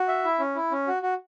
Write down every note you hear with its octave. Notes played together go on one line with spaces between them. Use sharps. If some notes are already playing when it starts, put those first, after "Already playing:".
Already playing: F#4
E5
E4
C#4
E4
C#4
F#4
F#4